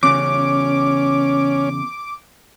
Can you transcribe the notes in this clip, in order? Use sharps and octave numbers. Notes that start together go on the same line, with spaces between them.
E2 C#3 C#4 D6